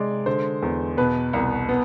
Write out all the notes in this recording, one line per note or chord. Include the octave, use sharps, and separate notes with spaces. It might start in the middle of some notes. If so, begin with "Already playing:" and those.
Already playing: C3 G#3 D5
D3 C5
E2
B2 B4
C2
B3